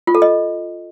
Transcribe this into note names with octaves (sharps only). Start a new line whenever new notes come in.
F4
A4
D#5